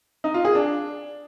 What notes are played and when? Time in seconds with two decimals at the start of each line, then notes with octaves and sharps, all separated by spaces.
0.24 D#4
0.34 F4
0.45 G#4
0.55 D4